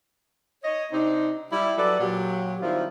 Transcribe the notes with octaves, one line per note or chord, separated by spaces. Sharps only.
C#5 D#5
C3 C4 D4 D#4
G3 E4
F#3 A4 B4 D5
A#2 F#3 G4
D#3 F3 G3 C4 E4 F4